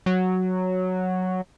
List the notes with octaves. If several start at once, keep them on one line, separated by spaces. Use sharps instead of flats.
F#3